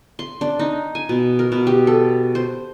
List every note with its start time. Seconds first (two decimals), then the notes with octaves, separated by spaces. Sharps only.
0.19 C6
0.41 D4
0.59 D#4
0.95 G#5
1.09 B2
1.39 A#4
1.52 B2
1.67 G4
1.87 A4
2.35 C5